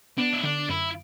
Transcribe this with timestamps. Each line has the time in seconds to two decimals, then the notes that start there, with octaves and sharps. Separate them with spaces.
0.18 B3 D4
0.33 E4
0.44 D3 D4
0.69 F#2 E4